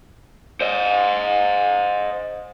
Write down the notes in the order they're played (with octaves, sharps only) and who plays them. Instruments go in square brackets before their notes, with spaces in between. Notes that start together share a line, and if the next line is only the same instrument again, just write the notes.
[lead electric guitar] C5 D#5